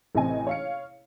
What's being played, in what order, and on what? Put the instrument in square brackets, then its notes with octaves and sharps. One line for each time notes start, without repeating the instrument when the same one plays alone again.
[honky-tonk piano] A1 C3 C4 D#5 G#5
C#5 F5 C#7